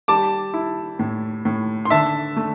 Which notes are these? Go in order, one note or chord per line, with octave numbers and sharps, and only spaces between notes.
G3 A5 D6
E4
A2
A2
C6
D3 E5 A5
A3